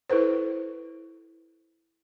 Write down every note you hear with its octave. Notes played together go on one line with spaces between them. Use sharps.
E4 A4 B4 C5